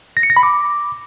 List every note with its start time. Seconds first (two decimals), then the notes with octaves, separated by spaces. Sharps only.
0.17 A#6
0.23 C#7
0.30 A#6
0.36 B5
0.43 D6